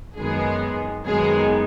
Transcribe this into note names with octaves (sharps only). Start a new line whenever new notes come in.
F#2 D#3 G#3 B3 G#4
F#2 D#3 G#3 B3 G#4